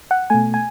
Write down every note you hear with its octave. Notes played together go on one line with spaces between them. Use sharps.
F#5
B2 A3 G#5
G#5